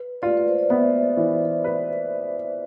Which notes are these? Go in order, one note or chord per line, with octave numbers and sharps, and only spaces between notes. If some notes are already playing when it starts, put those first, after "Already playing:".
Already playing: B4
F4 D5
B4
C5
D5
B3 E5
E3
B4